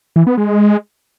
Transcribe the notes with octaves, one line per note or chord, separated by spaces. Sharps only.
E3
B3
G#3